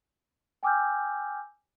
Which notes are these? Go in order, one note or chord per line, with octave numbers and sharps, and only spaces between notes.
G5 G#5 D6 E6 F6 G6